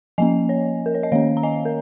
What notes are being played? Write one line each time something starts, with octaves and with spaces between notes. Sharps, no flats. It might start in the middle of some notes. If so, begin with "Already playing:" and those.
F3 A#3 C#4 D#5 G#5
C#5
A#4
C#5
D#5
D#3 A#3 C#4 C#5 F5
A#5
D#5 G#5
A#4